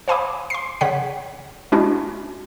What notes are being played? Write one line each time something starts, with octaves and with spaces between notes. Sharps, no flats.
C5 F5 G#5 B5 C6 D6
C6 C7
C#3 C#5 F#5 B6
G#3 C#4 D4 E4 F#4